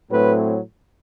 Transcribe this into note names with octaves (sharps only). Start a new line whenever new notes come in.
A2 F#3 A3 C4 B4